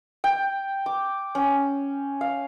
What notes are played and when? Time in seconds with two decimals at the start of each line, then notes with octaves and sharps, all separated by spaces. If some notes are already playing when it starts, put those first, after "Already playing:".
0.24 G5
0.86 D6
1.35 C#4
2.21 F5